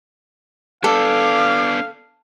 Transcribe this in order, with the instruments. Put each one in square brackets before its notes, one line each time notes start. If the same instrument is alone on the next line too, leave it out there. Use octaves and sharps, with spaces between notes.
[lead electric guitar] B3 D4 [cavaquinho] A4 [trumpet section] F5 [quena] D6